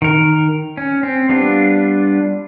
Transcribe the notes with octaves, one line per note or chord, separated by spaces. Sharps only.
D#3 A#4
C#4
C4
G3 B3 D4 F4